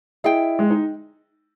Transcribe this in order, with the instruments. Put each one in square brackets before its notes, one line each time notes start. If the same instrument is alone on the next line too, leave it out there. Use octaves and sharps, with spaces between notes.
[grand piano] E4 [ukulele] G#4 D#5 G5
[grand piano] G#3
D#4